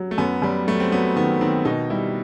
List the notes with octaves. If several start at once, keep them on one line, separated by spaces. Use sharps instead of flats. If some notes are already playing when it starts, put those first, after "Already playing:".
Already playing: F#3
A3
F#2 B3
F#2 G3
F#3 A3
C4
F#3 B3
D#3 B3
D#3 C4
B2 D#4
G3 E4